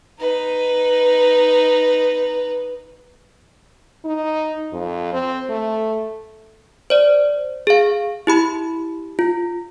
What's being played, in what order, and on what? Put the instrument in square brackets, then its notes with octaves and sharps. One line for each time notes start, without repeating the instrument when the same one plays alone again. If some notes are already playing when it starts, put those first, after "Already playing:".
[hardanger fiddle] D#4 B4
[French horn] D#4
F2
C4
A3
[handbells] C5 D5
G#4 F5
E4 G4 B5
F4